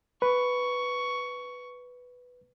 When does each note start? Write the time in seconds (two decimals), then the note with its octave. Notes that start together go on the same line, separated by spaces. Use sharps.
0.22 B4 C#6